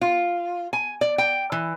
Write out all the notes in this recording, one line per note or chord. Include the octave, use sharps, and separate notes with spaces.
F4
G#5
D5
G5
E3